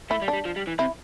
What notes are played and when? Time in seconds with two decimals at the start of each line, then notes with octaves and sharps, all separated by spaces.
0.10 A3 E4
0.22 G3
0.28 D4
0.33 G3
0.45 F3
0.56 G3
0.67 E3
0.79 C3 E4